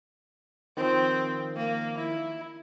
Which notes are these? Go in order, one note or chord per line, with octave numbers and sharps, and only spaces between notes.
D#3 F3 C4
A#3
E4